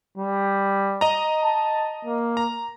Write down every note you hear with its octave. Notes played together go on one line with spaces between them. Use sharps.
G3
D#5 A#5
A5
A#3
A#5